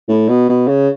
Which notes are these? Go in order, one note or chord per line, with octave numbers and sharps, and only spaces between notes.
A2
B2
B2
C#3